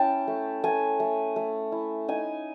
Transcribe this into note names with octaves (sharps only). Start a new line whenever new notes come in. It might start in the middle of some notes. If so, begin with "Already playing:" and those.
Already playing: C#4 E4 G5 A5
A3
A3 G#5
A3
A3
E4
D#4 G#5